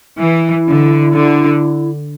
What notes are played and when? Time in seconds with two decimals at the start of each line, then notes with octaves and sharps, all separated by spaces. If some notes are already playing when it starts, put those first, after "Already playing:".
0.20 E3 E4
0.68 D3
1.15 D3